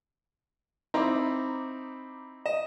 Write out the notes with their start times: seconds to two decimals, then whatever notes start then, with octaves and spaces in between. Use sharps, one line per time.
0.94 C4 D#4 E4 A#5 B5 D6
2.46 D#5 E7